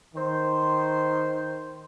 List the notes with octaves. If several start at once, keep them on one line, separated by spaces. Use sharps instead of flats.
D#3 C5